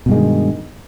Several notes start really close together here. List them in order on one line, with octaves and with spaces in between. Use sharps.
B2 G2 G#3 D#3